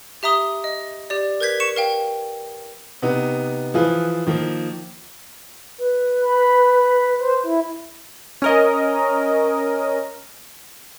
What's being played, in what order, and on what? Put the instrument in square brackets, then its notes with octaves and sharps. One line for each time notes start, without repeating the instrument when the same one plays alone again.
[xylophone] G4 E5 A#5 D#6 G7
D#5
G4 D5
A#4 B4 G6 G#6 B6
C#6 C#7 E7
A#4 F5 G5
[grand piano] C3 B3 D#4
E3 F3 F4 G#4 B4
D#3 F3 A#3
[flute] B4
[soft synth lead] B5
C5
E4
[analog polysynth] C#4 A#4 D#5